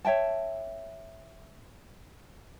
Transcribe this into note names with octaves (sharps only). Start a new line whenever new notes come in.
C#5 E5 G5 A5